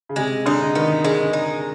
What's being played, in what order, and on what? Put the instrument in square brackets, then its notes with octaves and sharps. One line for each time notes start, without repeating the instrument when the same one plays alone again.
[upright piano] C#3
[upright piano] C3 [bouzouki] G#3
[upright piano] D3 [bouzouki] D#4
[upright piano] D#3 [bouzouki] B3
[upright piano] D3 [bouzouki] G#3
[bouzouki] D#4